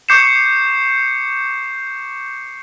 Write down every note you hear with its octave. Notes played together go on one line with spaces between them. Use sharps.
C#6 D6 G6 C7 C#7 E7